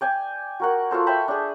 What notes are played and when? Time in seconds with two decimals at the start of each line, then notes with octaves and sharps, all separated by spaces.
0.01 D5 G5 G#5
0.60 F#4 A#4 F#5
0.91 F4 F#4 A4 C5
1.07 E5 G5 A5 B5
1.28 D4 G#4